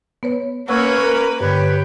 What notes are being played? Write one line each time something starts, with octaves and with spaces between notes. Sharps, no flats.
B3 B4 C#5
A#3 C#4 B4 C#5 F#5 E6 F#6
A#4 F#6
G2 D3 G4 B4 C#5